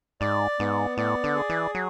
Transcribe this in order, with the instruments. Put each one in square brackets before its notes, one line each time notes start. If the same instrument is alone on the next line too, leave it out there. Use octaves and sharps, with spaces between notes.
[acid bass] G#2 [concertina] D5
[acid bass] G#2 [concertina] B3
[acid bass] A2 [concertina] D5
[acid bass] D3
[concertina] G#4
[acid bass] E3
F#3